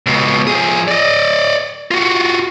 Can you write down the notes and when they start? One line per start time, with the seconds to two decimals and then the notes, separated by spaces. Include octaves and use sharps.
0.06 C#2 B2
0.47 F3 G#4
0.88 D5 D#5
1.91 F4 F#4